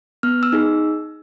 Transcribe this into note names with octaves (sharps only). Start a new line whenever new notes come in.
B3 F6
E6
D#4 G#4